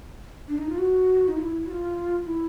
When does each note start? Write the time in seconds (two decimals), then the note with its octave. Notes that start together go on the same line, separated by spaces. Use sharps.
0.48 D4
0.58 D#4
0.69 F4
0.78 F#4
1.28 D#4
1.38 F4
1.42 E4
1.66 F#4
1.71 F4
2.26 E4